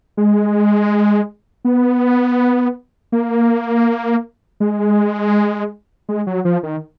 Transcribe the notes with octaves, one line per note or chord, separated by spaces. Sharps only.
G#3
B3
A#3
G#3
G#3
F#3
F3
D#3